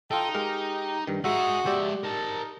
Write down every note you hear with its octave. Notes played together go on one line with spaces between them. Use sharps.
D#4 F4 A4 G5
G#3 G4 A#4
G2 D#3
G#3 D#4 F#4 G#4 E5
G#3 G4 D5 E5
D#4 A#4 A5